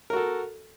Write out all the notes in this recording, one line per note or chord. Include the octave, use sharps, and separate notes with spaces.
F#4 A4 A#4